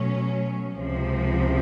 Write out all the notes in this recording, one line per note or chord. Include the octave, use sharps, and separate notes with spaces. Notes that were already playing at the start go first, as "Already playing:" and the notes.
Already playing: B2 F#3 A3 C#4
C#2 C3 F3